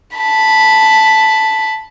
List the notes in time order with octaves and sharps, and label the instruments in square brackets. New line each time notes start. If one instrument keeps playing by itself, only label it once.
[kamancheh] A5 B5